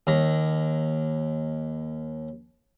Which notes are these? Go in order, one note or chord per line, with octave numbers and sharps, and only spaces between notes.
D#2 A#5